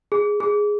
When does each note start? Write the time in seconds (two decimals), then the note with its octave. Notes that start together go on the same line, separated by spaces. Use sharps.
0.12 G#4
0.40 G#4